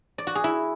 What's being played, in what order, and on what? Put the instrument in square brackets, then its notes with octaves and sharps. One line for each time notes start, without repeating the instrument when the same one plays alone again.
[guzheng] D5
F#4
G#4
E4